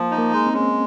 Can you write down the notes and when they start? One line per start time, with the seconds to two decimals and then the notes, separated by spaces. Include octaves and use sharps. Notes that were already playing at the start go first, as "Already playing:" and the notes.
Already playing: F3 A#3
0.11 D#4
0.18 A#3
0.33 G#3
0.47 C4
0.53 G#3 C#4
0.61 C4